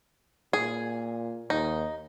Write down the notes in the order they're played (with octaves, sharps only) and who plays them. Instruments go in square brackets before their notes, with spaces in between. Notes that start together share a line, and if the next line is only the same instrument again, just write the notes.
[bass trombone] A#2 [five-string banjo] G#4
[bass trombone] D#2 [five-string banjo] D#4